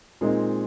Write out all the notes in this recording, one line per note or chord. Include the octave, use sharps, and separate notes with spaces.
A#2 G#3 C4 D#4